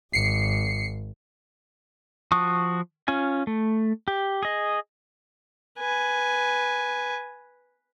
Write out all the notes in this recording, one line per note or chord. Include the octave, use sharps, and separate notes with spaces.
G#1 C7 C#7
F3 F#4 A5 C#6 D#6
C#4 F4 G#5
A3
G4
G#4 D#5
B4 G#5